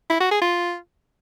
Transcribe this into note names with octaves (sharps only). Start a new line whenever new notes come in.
E4
F#4
G#4
F4